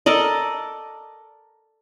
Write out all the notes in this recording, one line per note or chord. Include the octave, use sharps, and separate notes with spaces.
A4 A#4 D5 D#5